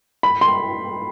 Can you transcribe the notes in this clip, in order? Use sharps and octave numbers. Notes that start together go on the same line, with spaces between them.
B5
C6